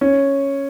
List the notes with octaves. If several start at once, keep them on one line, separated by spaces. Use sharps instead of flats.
C#4